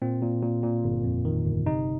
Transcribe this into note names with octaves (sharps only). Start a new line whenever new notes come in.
A#2 C4
A#2
A#2
A#2
G1
F2
D#3
G1
C3 D#4